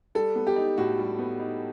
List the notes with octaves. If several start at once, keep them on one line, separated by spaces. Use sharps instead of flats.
G3 A4
B3
G4
D#4
A2 F#4
G3
B3
D#4